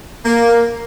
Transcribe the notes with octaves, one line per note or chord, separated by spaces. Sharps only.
A#3